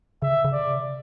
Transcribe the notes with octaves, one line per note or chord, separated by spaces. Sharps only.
C#3 E5
C#3
D5
C3